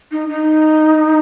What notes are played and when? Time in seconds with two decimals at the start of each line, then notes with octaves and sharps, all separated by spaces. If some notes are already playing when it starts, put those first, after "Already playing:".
0.11 D#4
0.29 D#4